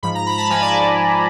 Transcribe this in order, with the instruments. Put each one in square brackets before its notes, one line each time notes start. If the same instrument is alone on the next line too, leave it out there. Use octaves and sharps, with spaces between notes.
[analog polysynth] G#2 F3 B5
A#5
B5
A5
F3 G#5
G#2
D5